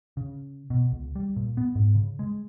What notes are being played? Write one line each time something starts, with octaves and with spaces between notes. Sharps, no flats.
C#3
B2
C#2
G3
A#2
B3
G#2
C#3
G#3